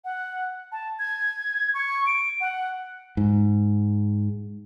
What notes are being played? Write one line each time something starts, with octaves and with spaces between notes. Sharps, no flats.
F#5
A5
G#6
C#6
D7
F#5
G#2